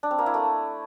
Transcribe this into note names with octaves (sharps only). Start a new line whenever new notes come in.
D4
C4
A#3
E4
A3